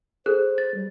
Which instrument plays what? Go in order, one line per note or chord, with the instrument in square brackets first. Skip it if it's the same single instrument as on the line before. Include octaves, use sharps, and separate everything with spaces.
[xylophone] G#4 A4 F#6 [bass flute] C5
[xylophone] A6
[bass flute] G3